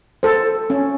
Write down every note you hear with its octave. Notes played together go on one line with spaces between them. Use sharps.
A4 C5
C#4